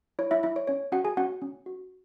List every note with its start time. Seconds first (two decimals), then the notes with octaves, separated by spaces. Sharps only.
0.19 E4 C#5
0.31 E4 E5
0.43 E4 E5
0.56 C#5
0.67 C#4 C#5
0.92 C#4 F#4 F#5
1.04 G#4 G#5
1.17 C#4 F#4 F#5
1.42 C#4
1.66 F#4